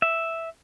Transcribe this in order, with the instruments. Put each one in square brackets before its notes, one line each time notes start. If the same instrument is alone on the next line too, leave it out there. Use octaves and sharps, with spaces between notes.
[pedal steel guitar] E5